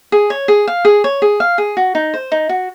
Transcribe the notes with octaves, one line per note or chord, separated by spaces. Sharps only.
G#4
C#5
G#4
F5
G#4
C#5
G#4
F5
G#4
F#4
D#4
C5
D#4
F#4